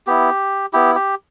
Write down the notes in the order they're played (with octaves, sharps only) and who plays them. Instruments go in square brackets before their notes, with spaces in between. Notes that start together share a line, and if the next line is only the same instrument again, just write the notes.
[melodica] B3 E4 G4
B3 E4 G4
G4